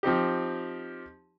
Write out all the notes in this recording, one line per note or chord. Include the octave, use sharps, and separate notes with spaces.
F3 C4 D#4 G4